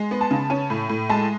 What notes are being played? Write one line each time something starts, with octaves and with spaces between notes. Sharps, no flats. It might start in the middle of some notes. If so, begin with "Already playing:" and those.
Already playing: G#3
B3
A5
C#3
C#4
A2
A2
G#3 A5